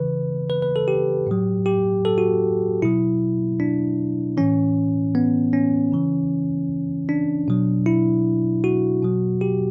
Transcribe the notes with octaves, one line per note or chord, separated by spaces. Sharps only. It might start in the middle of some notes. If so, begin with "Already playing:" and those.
Already playing: C#3 E3 B4
B4
B4
A4
G4
A2 F#3
G4
A4
F#4
B2 F#3 E4
D4
A2 E3 C#4
B3
C#4
C#3 E3
D4
B2 F#3
E4
F#4
B2 F#3
G4